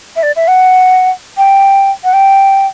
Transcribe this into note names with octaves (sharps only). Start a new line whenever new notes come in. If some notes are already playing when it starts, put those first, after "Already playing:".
E5
D5
E5
F#5
G5
F#5
G5